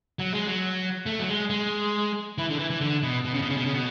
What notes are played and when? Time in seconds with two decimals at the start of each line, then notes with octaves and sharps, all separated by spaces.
0.19 F#3
0.33 G#3
0.47 F#3
1.06 A3
1.20 F#3
1.28 G#3
1.50 G#3
2.38 E3
2.50 D3
2.59 E3
2.70 E3
2.81 D3
3.03 B2
3.25 B2
3.34 C#3
3.42 B2
3.50 C#3
3.57 B2
3.66 C#3
3.74 B2